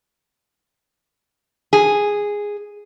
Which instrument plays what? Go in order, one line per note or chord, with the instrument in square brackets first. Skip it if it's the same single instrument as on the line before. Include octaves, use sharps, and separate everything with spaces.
[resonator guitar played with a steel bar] G#4